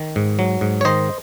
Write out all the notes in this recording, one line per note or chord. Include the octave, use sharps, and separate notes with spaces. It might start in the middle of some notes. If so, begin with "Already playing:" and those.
Already playing: D#3
G#2
F#3
G#2
C#5
D#3 C5 D#5